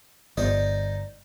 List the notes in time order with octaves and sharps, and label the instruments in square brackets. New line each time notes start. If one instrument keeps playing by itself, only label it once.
[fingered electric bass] G1 [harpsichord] D#4 C5 D5